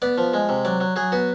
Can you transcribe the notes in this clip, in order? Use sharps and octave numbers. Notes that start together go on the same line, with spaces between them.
B3 D5
F3
G#3
C3
F#3 D5
F#3
F#3 G#4
B3 F#4